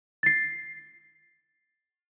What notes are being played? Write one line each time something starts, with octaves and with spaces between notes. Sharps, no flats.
A6 C7